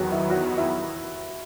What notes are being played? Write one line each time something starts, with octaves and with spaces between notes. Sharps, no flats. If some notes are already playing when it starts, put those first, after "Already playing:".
Already playing: E2 D#3 F#3 B3 F#4
E4
F#4
E4